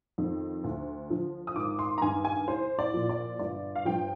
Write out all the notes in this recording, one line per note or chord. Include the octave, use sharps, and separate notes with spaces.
F2 D#3
D2
D3 F3
D#6
G#1 D6
C6
A#5
G2 D#3 G#5
G#5
C2 C5
D5
A#2 F3
D5
G1 D5
F5
G2 F3 G5